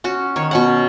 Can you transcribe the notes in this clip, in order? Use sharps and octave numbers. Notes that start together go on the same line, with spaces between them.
C#4 F#4
D#3 C#5
B2 C#4 F#5